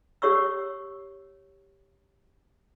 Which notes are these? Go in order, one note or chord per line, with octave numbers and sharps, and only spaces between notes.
G4 C#5 C#6 E6